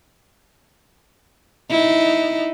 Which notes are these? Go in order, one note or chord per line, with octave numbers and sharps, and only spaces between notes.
D#4 E4